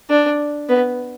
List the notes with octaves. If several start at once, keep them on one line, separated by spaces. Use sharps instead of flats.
D4
B3